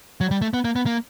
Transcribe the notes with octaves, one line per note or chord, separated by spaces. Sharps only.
F#3
G3
A3
B3
A#3
B3
A#3